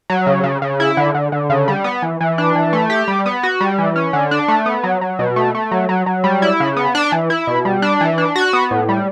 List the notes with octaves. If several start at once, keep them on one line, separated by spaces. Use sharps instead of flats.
F#3
C#3
C#3
C#3
E4
D3
D3
D3
C#3
G3
B3
E3
E3
D4
E3
A3
G4
G3
B3
F#4
G3
E3
C#4
D3
D4
A3
B3
F#3
F#3
B2
A3
A3
F#3
F#3
F#3
G3
E4
C#3
B3
D4
E3
E4
B2
G3
D4
E3
D4
F#4
B3
A2
G3